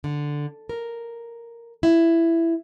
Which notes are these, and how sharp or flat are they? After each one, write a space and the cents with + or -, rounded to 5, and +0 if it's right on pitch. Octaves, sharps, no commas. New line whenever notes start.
D3 +0
A#4 +0
E4 +10